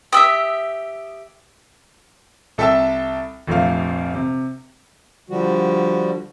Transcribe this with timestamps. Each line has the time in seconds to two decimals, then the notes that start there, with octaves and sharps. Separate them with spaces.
0.12 G4 E5 D#6 E6
2.58 C2 A4 E5 G5 A5 E6
3.47 F1 A#1 C3 A3 F5
4.15 C3
5.29 D3 F3 G3 F#4